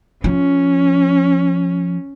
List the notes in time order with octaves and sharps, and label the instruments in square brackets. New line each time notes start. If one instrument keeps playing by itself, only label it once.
[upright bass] F3 [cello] C#4